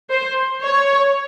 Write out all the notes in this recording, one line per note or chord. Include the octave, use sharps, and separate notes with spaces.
C5
C#5